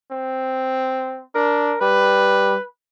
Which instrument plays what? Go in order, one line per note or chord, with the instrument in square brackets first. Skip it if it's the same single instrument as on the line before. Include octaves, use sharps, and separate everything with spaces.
[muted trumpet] C4
[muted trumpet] D4 [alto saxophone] A#4
[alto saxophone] G3 [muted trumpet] B4